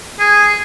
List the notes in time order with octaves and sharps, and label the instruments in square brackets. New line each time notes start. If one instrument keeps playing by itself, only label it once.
[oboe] G#4